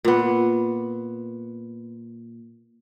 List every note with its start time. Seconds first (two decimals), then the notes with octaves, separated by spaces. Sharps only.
0.05 A#2 B3